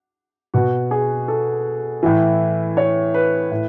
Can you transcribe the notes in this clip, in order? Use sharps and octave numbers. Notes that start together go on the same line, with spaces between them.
B2 F#4
G#4
A4
A2 E3
C#5
B4
A2